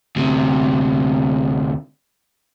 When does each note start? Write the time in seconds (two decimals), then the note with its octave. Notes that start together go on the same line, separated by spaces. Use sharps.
0.16 D2 C3